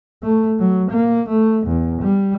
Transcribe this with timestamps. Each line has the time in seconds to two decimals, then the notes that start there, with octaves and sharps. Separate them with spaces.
0.23 A3
0.60 F#3
0.91 A#3
1.29 A3
1.66 E2
2.02 G3